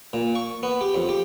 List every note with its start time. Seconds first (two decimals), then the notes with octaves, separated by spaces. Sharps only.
0.13 A#2
0.35 C#6
0.63 B3
0.81 G4
0.94 F2
1.09 G4